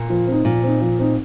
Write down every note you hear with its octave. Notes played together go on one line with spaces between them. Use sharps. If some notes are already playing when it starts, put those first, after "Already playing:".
Already playing: A#2
F3
C4 D#4
A#2 F3
C4 D#4
F3
C4 D#4